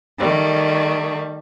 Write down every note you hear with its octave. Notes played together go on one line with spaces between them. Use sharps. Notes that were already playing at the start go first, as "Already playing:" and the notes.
D#3 G3 A3